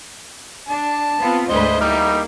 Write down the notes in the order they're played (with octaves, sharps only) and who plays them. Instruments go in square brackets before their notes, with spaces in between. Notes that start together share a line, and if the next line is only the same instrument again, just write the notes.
[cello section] D4 [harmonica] A5
[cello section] B3 C4 F4
[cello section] D2 G#2 B4 [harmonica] C5 D#5
[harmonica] G3 D#4 [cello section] A#3 E4